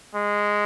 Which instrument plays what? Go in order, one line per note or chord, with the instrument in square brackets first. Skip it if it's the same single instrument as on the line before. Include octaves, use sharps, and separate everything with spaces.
[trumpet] G#3